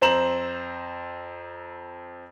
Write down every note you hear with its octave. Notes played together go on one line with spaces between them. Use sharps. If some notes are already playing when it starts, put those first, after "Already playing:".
F2 C4 C5 A#5 E7 F#7